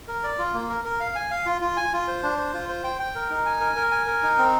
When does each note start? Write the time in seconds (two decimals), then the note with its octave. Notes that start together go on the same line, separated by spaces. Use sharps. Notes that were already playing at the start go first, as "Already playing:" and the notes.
0.08 A#4
0.23 D5
0.39 F4
0.54 A#3
0.69 A#4
0.85 A#4
1.00 F5
1.15 G#5
1.31 F5
1.46 F4
1.61 F4
1.77 G#5
1.93 F4
2.08 C5
2.23 D4
2.38 C5
2.53 F4
2.69 C5
2.84 G5
2.99 G5
3.15 A#4
3.30 D#4
3.46 G#5
3.61 A#4
3.76 A#4
3.91 G#5
4.07 A#4
4.22 D#4
4.38 C4